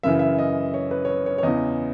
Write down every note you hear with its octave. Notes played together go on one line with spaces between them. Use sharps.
F#2 C#3 E3 E5
E5
D#5
C#5
B4
C#5
B4
C#5
C#5
E2 C#3 E3 D#5